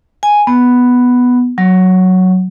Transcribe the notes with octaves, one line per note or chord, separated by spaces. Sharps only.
G#5
B3
F#3